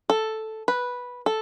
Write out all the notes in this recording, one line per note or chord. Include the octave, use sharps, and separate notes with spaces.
A4
B4
A4